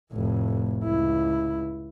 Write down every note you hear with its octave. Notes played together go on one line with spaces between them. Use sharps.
F1 A2
C#2 E4